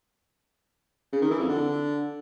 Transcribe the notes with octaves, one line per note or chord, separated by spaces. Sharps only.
C#3
D#3
E3
F2
D3